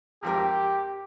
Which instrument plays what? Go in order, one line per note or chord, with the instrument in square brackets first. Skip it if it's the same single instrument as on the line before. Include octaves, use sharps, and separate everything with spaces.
[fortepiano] G#1 F2 A#4 [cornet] G4